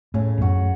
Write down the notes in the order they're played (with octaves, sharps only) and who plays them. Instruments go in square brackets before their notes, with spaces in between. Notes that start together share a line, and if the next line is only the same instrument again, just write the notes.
[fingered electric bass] A2 [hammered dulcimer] C#3
[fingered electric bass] E2
[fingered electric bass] F#2 [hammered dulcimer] F#4